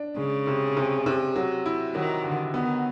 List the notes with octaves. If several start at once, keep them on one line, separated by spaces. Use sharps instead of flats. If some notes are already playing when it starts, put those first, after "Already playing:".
Already playing: D4
C#3 G#3
C3
C3
C3
F#3
E4
D#3 F#3
D3
D#3 B3